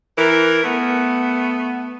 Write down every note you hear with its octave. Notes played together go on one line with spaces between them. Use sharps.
E3 A#4
A3 B3